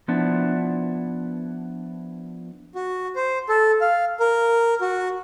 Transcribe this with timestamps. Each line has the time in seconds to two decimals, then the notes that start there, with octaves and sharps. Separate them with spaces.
0.08 F3 B3 D4 E4
2.75 F#4
3.16 C5
3.49 A4
3.81 F5
4.20 A#4
4.81 F#4